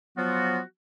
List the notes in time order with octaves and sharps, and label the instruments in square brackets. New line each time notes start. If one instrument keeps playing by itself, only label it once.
[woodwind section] F3 F#3 B3 F4 F#4